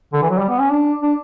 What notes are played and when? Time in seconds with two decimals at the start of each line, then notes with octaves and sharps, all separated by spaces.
0.13 D3
0.22 E3
0.30 F#3
0.38 G3
0.49 B3
0.59 C#4
0.70 D4
1.02 D4